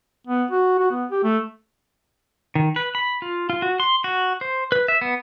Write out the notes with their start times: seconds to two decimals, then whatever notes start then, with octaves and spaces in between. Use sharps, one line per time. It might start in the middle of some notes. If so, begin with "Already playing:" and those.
0.27 B3
0.51 F#4
0.79 F#4
0.91 B3
1.11 G4
1.23 A3
2.55 D#3
2.76 B4
2.95 B5
3.22 F4
3.50 F4
3.62 F#4
3.80 C6
4.04 F#4
4.41 C5
4.72 B4
4.88 E5
5.02 B3